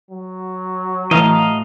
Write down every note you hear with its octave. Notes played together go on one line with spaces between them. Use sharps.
F#3
A2 E3 D#5 F5 A#5